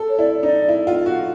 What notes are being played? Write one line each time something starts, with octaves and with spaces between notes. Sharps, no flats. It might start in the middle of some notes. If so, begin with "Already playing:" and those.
Already playing: A4
C#5
E4 D5
D#4 D5
E4
F4
F#4